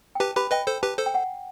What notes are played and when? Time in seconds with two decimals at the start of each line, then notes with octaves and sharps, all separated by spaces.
0.15 G5
0.20 G4 B4 A5
0.35 G4 B4 B5
0.51 B4 D#5 G5
0.67 A4 C5
0.83 G4 B4 A5
0.98 A4 C5
1.06 G5
1.14 F#5